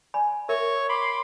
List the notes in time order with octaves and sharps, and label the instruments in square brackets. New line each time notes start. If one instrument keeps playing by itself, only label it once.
[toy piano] D5 G#5 B5
[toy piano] A#4 E5 [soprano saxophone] C#5
[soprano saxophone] B5 [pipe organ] C6 D6